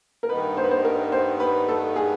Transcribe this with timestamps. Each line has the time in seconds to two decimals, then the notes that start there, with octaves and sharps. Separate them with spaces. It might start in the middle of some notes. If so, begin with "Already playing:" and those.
0.23 A#4
0.29 G2 D#3 G3 B3 D#4 B4
0.57 C5
0.64 B4
0.71 C5
0.84 A#4
1.12 C5
1.40 B4
1.68 A4
1.96 G#4